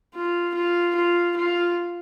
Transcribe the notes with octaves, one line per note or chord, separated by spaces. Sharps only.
F4
F4
F4
F4